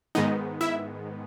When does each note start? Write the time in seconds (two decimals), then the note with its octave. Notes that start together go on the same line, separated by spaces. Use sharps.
0.15 G#2 D#3 G#3 B3 D#4 D#5
0.61 E4 E5